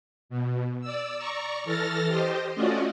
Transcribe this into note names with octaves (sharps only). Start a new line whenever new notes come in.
B2
D5 E6
D5 A#5 C#6
E3 A4 F6 A6 A#6
G4 C5 D#5
A3 C#4 F4 F#4 D5 D#5